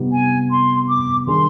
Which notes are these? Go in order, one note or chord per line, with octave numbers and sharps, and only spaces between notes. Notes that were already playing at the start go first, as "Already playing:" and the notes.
Already playing: C3 G3 B3 D#4 G4
G#5
C6
D6
D#3 G3 D4 G#4 C6